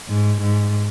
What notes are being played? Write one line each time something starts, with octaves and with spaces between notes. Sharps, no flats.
G#2
G#2